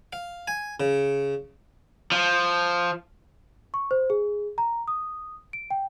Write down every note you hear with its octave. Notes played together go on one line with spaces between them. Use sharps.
F5
G#5
C#3
F3
C#6
C5
G#4
A#5
D#6
D7
G5